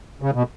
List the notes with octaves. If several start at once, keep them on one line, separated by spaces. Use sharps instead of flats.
C#3
B2